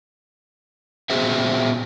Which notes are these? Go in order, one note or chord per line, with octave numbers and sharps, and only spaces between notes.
A#2 B3 F#4 G#4 C5 E5